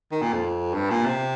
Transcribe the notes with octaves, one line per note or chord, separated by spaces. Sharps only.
D#3
A#2
F2
G2
A#2
C3